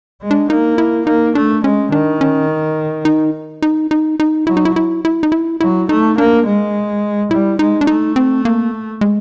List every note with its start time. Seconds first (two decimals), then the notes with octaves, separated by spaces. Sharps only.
0.22 G#3
0.31 D4
0.50 A#3 D#4
0.78 E4
1.06 A#3 D#4
1.35 A3 D4
1.64 G#3 C#4
1.92 D#3 D4
2.21 C#4
3.05 D#4
3.62 D#4
3.91 D#4
4.20 D#4
4.47 F#3 E4
4.57 D#4
4.65 E4
4.76 E4
5.05 E4
5.23 D#4
5.32 E4
5.61 F#3 E4
5.89 A3 D#4
6.18 A#3 D4
6.45 G#3
7.31 G3 E4
7.59 G#3 D#4
7.81 D4
7.87 A3 D#4
8.16 C4
8.45 A#3
9.01 G#3